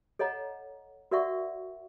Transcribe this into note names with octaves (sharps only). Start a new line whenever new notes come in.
A4 C#5 D#5 F#5 A#5
F#4 A#4 D5 E5 F#5 C#6